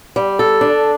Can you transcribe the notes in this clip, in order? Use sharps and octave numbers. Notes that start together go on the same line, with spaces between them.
G3
A4
D4